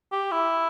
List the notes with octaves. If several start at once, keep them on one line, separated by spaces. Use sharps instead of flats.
G4
E4